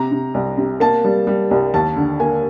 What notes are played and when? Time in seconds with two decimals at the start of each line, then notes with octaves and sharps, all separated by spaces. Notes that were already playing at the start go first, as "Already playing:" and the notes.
Already playing: C3 A#5
0.12 C3
0.34 C2
0.58 C3
0.80 A#3 A5
1.04 G3
1.27 G3
1.51 C2
1.74 D#2 A5
1.96 D3
2.20 A#3 G#5